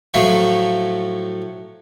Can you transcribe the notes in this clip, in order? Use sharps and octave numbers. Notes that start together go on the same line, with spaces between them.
A2 F3 F#3 A3 C#5